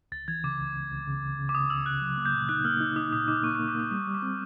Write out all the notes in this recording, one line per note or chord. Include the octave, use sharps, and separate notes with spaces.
C#2 A6
E3 G#6
C#3 D6
C#2
C#2
C#2
C#3
C#2
C#3
D6
C#3 D#6
C#2 E6
C#3 F#6
F#3
A#3
G6
A#2
D#4 F#6
A#3 F6
D#4 E6
D#4 D#6
A#2 D#6
D#4 D6
A#3 C#6
A#3 C#6
D6
A#3 D#6
G3 D#6
G3
D6
C4